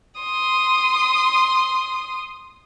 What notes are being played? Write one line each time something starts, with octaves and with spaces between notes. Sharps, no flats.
C6 D#6